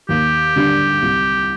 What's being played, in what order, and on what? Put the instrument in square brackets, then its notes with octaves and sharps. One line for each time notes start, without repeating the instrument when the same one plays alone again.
[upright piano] D#2 [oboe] G4
[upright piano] D3 G3 D4
C2